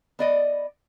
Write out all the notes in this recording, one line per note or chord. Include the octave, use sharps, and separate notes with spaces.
B3 D5 D#5